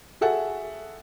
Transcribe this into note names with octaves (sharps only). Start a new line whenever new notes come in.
F#4 G#4 A4 E5 F#5